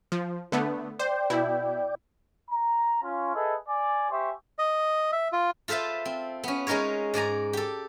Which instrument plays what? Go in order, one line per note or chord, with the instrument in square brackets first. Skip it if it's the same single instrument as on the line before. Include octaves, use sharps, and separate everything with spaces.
[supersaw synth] F3
D3 A3 B3
[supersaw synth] C5 [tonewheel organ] D5 G5
[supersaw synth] B2 E4
[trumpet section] A#5
C#4 F4
G#4 A4 B4 D#5 E5
D5 G#5
G4 C5 E5 G#5 C#6
[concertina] D#5
E5
F4
[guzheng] F4 A4 B4 C5 E5
C4
B3 C#4
G#3 C#4 D#4 A#4 C#5
G#2 D5 G#5 A#5
G4 A4